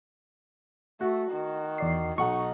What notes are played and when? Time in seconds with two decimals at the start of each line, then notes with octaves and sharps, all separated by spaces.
1.01 A3 F#4
1.32 D#3
1.78 E2 D5 C7
2.18 B1 D#4 F#5 C#6